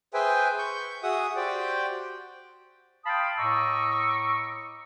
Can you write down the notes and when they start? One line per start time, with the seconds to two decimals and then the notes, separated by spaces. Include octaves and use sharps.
0.14 G#4 B4 C5 E5 G5 G#5
0.58 C#6 G6
1.03 F#4 G#4 E5 F#5 D#6
1.36 F#4 G4 C5 D5 G5
3.06 F5 G5 A5 B5 C6 D#6
3.38 A2 D#5 A#5 C#6 D6 E6